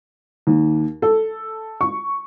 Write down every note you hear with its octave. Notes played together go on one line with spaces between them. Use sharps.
D#2
A4
C#6